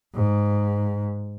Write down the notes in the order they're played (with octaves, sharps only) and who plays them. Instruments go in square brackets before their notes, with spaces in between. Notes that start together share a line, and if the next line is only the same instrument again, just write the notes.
[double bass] G#2